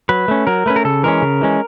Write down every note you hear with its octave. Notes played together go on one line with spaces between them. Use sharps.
F#3 B4
A3 C#4
F#3 A#4
A3 C#4 B4
A#4
C#3 A4
E3 G#3 C#4 A#4
C#3
E3 G#3 C#4